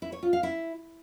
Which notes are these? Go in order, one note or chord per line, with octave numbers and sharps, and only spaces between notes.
E4
C#5
F4
F5
E4